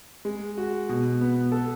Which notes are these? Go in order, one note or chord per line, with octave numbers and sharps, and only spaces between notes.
G#3
F#4
B2
B3
A4